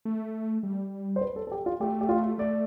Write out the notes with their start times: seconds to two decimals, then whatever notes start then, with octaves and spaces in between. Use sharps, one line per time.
0.05 A3
0.63 G3
1.16 C5
1.21 B4
1.36 A4
1.47 A4
1.51 G4
1.66 F4
1.80 A3 G4
2.01 G4
2.09 F4
2.38 A3 D5